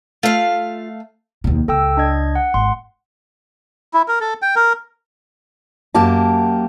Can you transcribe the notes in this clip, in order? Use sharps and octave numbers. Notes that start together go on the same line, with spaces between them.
A3 F4 F5
D#2 B2
C#2 A4 G5 E6
D4 D#5 G#6
F#5
G#1 C6
E4
A#4
A4
G5
A#4
F#2 A#3 G4 A5